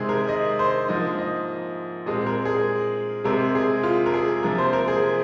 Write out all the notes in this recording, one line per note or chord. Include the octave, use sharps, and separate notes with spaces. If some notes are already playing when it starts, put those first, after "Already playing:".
Already playing: C3 D#3 G#3 C4 G#4
A#4
D#5
C5
G#2 F3 A#3 D#5
D#5
A#2 G#3 C4 D#5
A#4
G#4
C3 G#3 C4 A#4
G#4
F4
A#4
G#4
C3 F3 A#3 A#4
C5
A#4
G#4